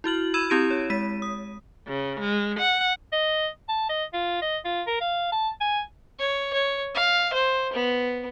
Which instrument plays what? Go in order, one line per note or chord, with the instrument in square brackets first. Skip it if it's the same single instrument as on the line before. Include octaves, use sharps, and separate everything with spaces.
[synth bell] E4 F#4 F6 F#7
B5 E6 G#6 D#7 E7
C4 E4 G4 G#6 D7 D#7
C#5
G#3 B6 D#7
D#6
[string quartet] C#3
G#3
F#5
[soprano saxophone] D#5
A5
D#5
F4
D#5
F4
A#4
F5
A5
G#5
[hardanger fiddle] C#5
C#5
F5
C5
B3